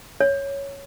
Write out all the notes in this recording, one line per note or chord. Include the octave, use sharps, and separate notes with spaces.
C#5